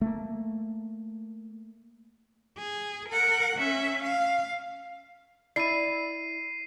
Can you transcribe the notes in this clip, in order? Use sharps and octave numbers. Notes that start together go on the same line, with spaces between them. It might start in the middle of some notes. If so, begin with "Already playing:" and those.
A3 A#3
G#4
A#4 F#5
C#4 E5
F5
E4 D5 C7 D#7